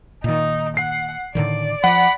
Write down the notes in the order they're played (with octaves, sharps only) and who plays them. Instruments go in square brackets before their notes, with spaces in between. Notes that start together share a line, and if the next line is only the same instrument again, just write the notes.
[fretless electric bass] A#2 D#3 [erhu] D#4
[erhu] F#5 [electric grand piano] C7
[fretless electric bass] A2 D3 D#3 [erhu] D5
[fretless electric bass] F3 [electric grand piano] F#5 [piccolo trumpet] B5